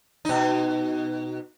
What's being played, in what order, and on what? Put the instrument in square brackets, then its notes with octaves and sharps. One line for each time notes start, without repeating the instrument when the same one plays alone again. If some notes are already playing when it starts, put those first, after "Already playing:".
[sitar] B2 D#4